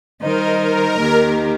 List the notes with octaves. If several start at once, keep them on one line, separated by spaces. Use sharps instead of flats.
D#3 G3 D#4 A#4 C5 D#5
A#4
D#2 D#3 A#3 G4